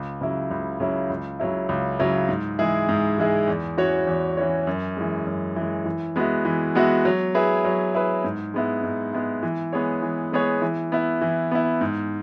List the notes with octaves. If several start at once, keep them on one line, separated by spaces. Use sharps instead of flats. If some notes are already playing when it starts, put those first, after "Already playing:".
Already playing: C#2
C#3 F#3 E4
C#2
C#3 F#3 E4
C#2
C#3 F#3 E4
C#2
C#3 F#3 E4
G#2
E3 G#3 E4 G#4
G#2
E3 G#3 E4 G#4
E2
E3 C#4 F#4 C#5
E2
E3 C#4 F#4 C#5
F#2
E3 G#3
F#2
E3 G#3
E3
G#3 B3 F#4 E5
E3
G#3 B3 F#4 E5
F#3
E4 G#4 B4
F#3
E4 G#4 B4
G#2
G#3 B3 E4
G#2
G#3 B3 E4
E3
G#3 B3 G#4 C#5
E3
G#3 B3 G#4 C#5
E3
B3 E4
E3
B3 E4
G#2